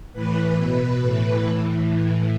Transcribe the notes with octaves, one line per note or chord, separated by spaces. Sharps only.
A2 E3 B4
B2 B4
A2 E3 B4
A2 E3
A2 E3